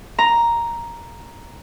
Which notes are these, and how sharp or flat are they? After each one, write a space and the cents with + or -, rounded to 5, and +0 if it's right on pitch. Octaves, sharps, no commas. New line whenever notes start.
A#5 +5